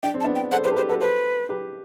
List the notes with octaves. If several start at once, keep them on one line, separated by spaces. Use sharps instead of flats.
D4 G5
C4
A5
B3 D4
G5
A4 C5 F#5
G4 B4 C5
A4
G4 B4 C5
F#4 A4 B4
A4 B4 C5
G4 B4